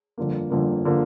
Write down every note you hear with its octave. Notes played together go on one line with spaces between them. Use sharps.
G1 F2 D3 F3 A#3
G1 F2 D3 F3 A#3
D3 F3 A#3